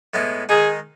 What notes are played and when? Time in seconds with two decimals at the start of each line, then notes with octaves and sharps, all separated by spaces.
0.14 A2 G#3 B3 E4
0.49 D#3 G#3 D#4 G#4